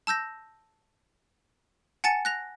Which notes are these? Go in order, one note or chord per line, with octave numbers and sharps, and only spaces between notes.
A5 E6 G6 A#6
F#5 G#5 A5 A6 C#7
F#6 A#6 F7